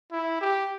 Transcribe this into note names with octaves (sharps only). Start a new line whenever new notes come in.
E4
G4